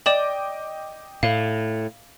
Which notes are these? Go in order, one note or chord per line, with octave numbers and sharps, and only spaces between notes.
D5 D#5 G5 D6 E7 F#7
A2 F5